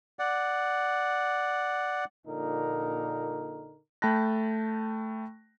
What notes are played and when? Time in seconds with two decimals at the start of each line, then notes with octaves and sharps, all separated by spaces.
0.19 D5 F#5
2.27 A#1 A#2 D3 D#4 A#4
4.02 A3 G5 A5 B5 F#6 A#6